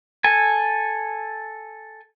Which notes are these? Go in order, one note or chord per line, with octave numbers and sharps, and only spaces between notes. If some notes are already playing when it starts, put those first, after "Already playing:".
A4 G#5